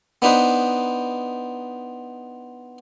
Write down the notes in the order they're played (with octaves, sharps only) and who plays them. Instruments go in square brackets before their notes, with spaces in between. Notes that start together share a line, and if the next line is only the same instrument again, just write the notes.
[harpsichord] B3 D4 D#4 B4 C5